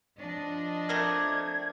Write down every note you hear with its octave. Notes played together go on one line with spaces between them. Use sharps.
F3 D4 D#5
A3 C4 A#4 D5 G#6